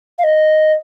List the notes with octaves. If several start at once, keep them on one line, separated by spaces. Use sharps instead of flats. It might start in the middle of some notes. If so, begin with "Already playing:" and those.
F5
D#5